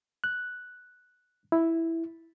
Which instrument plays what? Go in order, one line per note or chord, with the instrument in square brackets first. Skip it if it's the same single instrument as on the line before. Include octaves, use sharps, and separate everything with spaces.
[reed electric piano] F#6
E4